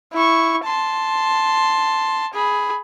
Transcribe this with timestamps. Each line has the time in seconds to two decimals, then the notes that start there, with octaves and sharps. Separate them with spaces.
0.13 E4 C#6
0.65 A5 C6
2.34 G#4 B5